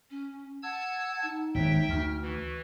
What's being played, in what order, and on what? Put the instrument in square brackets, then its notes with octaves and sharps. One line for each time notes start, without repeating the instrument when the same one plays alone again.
[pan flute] C#4
[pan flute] F#5 [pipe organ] A5 E6 G#6
[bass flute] D#4
[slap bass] G#1 E2 [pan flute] C#5 [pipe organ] E5 G5
[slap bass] D2 [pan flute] F6
[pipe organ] E3 [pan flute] F#4